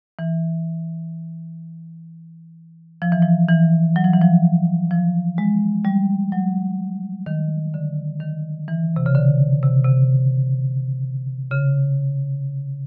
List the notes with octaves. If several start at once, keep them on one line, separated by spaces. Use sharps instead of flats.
E3
F3
E3
F3
E3
F#3
F3
E3
F3
F3
G#3
G3
F#3
D#3
D3
D#3
E3
C3
C#3
D3
C3
C3
C#3